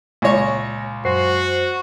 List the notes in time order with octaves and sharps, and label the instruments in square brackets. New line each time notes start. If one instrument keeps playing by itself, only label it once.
[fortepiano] C#2 C#5 [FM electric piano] A#2 G#5 A#6
[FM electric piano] F#2 C5 C7 [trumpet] F#4